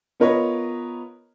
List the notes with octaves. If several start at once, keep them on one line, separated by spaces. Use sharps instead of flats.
B3 F4 A#4 B4 C#5 D#5